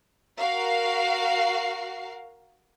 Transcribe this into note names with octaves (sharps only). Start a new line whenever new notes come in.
F#4 A#4 F5 C7